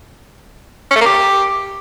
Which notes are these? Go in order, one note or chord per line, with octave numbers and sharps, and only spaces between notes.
C#4
A3
A#3
G4